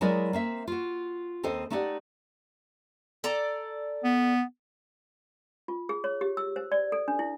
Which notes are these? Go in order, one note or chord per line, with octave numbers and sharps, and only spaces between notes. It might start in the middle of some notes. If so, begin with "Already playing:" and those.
F#3 G#3 E4 A#4 D5 D#5
A#3 C4 E5
F4 F#4
D#2 C4 A4 C5 D#5
A3 D#4 E4 G4 D5 F#5
A4 D5 A#5
B3
F4
G#4
C#5
G4
E6
C5
D5
A4
D4
E4